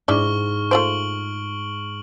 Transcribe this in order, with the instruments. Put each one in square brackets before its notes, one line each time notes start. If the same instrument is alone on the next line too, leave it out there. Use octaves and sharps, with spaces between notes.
[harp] G#2 [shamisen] D4 E4 D5 [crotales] C#6 F6 G7
[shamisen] A3 F4 C5 [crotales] D7 F#7